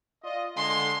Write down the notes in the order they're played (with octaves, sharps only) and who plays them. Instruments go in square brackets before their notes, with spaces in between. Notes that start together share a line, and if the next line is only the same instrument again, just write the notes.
[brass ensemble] F4 D5 D#5
[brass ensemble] D3 G#3 [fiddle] C6